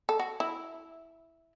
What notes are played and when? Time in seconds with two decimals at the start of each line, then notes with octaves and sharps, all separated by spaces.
0.09 A4
0.19 F#4
0.40 E4